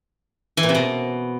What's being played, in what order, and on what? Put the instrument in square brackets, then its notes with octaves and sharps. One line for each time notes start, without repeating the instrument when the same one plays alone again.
[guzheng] E3
A#2
C3
B2